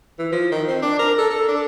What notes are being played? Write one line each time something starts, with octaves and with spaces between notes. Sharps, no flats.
E3
F3
D#3
C4
D4
A#4
A4
A4
D4